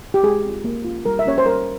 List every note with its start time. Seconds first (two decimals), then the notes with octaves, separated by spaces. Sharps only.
0.14 G4
0.23 G#3 G#4
0.45 C4 F4
0.64 A#3
0.85 C#4 F4
1.06 G3 A#4
1.19 E5
1.26 A#3 C#4 G4 C#5
1.38 C5
1.46 G3 A#4